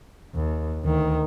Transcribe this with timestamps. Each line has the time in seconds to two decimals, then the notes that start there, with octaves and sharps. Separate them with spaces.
0.35 D#2
0.84 D2 D#3